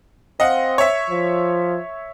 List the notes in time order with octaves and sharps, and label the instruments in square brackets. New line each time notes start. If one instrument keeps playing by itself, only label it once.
[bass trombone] C4 [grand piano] D#5 F5 F#5
[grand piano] C#5 E5
[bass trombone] F3